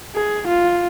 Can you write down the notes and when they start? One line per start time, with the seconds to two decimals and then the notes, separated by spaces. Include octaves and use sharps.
0.15 G#4
0.47 F4